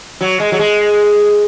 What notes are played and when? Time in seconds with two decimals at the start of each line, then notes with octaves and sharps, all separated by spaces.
0.21 F#3
0.40 G#3
0.52 F#3
0.59 G#3